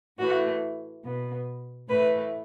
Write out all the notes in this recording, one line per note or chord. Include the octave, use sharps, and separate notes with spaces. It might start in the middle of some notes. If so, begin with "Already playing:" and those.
A2 E3 A3 F#4
B2 B3
A2 E3 A3 B4